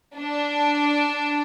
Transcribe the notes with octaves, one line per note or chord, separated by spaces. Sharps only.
D4